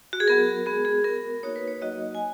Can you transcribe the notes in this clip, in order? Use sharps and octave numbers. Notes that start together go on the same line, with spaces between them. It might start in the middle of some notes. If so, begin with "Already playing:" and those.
F#4
G#4
F#3 B3 F#4 A#4
G#3 B3 F#4 G#4
G#4
B3 F#4 A#4
A#3 D#4 F#4 C#5
B4
C#5
F#3 A#3 D#4 F#4 D#5
G#5